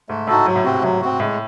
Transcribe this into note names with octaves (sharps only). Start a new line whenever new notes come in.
G#2 A3
A2 D#4 F#4 A4
G#2 F#3
A2
C3 C4 F#4
G#2
A2 F#3
C4 F#4
A2 G#3